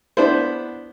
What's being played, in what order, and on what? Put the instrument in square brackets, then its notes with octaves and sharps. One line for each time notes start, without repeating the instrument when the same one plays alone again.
[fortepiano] B3 D4 E4 B4 C5